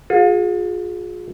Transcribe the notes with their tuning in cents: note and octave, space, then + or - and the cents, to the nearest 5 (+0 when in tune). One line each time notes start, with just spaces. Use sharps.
F4 +40 G#4 +0